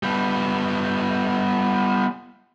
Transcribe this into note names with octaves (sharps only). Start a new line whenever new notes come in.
G3 B3